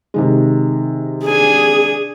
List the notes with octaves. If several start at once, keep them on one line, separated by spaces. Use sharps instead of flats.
C3 D#3 G#3
D4 G#4 G#5